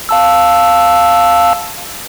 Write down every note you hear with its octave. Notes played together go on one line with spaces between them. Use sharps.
F5 A5 E6